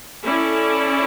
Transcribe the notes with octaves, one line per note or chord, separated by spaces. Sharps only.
C#4 E4 A4 D5